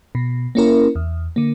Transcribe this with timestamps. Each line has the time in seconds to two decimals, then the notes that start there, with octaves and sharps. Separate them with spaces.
0.15 B2
0.55 A#3 C#4 E4 A#4
0.95 E2
1.36 D3 A#3